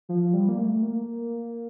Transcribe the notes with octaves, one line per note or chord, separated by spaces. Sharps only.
F3
G3
A#3
A3
A#3